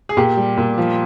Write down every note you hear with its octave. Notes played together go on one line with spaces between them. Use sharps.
G#4
A#2 G4
G3
A#2
F3